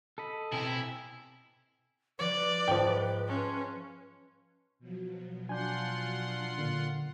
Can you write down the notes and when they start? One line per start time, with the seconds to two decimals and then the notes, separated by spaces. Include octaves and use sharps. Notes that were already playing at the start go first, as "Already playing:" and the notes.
0.18 A4 D#5 B5
0.53 B2 C4 E4 G5 G#5 E6
2.19 F3 G3 B4 D5
2.68 G#2 F3 G5
3.28 C#4 F5 A5 C6
4.79 B2 F3 F#3
5.49 D4 F4 F#5 G#5 C6 G6
6.58 A#2 D3